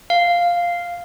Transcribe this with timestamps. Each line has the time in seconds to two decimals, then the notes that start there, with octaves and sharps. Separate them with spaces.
0.10 F5